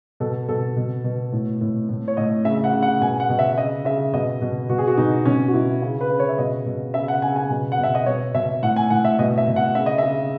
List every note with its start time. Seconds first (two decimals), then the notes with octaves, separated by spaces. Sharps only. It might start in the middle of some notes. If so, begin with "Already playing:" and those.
0.20 B2 A4
0.49 B2 A4
0.76 B2
1.04 B2
1.32 A2
1.61 A2
1.89 A2
2.08 C#5
2.17 A2 D#5
2.45 C#3 E5
2.64 F#5
2.73 C#3
2.83 F#5
3.01 B2 G#5
3.20 F#5
3.29 B2
3.39 E5
3.57 C#3 D#5
3.85 C#3 E5
4.13 B2 D#5
4.41 B2
4.69 B2 F#4
4.78 G#4
4.87 F#4
4.97 B2 D#4
5.25 B2 C#4
5.48 F#4
5.54 B2 E4
5.82 C#3
6.01 B4
6.10 C#3
6.19 C#5
6.29 E5
6.38 B2 D#5
6.66 B2
6.94 C#3 E5
7.08 F#5
7.22 C#3 G#5
7.36 G#5
7.50 B2
7.72 F#5
7.79 B2 E5
7.95 D#5
8.06 B2 C#5
8.34 B2 E5
8.63 A2 F#5
8.76 G#5
8.90 A2 F#5
9.05 E5
9.19 B2 D#5
9.38 E5
9.47 B2
9.56 F#5
9.75 C#3 E5
9.86 D#5
9.98 C#3 E5